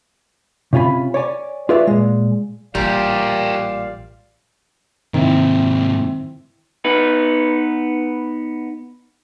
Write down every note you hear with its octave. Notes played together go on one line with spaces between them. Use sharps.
C3 C#4 F4 G#5 B5
C#5 D5 G#5
F4 G#4 B4 C#5 D5 E5
A#2 G#3
A1 A#2 G3 G4 A#4 D5 F5
G#2 C3 D#3 C4 E4
B3 D#4 B4